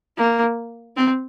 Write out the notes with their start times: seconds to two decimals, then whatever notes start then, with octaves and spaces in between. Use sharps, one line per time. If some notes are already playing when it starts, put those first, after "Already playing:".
0.17 A#3
0.97 C4